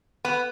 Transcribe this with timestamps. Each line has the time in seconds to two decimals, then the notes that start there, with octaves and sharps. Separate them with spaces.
0.25 B3